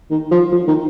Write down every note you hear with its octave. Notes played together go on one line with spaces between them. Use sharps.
D#3
F3
F3
D#3